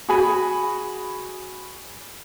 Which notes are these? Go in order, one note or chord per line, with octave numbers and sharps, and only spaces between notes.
F#4 G#4 G#5 B5